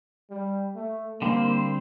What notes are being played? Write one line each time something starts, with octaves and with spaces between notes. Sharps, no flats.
G3
A3
D3 G3 A#3 C4 G4 C5